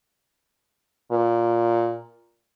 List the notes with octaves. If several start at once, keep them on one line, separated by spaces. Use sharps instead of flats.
A#2